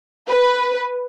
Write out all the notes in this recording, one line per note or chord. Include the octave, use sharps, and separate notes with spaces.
B4